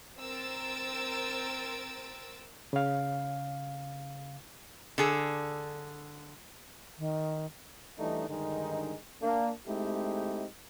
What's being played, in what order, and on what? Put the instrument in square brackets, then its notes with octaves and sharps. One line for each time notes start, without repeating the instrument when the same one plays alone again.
[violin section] C4 A#4 E6 A6 D7
[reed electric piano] C#3 F5
[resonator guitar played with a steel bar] D3 G#4 A4
[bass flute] D#3
[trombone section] E3 G3 A3 D4 D#4
G2 D3 D#3 G#3 D#4
A#3 D4
G#3 A3 C4 D#4 E4 G4